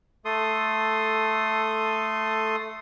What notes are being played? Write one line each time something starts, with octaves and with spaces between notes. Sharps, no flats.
A3 A4 C6 D#6